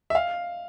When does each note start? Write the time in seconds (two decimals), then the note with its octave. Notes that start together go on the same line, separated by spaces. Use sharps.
0.10 E5
0.15 F5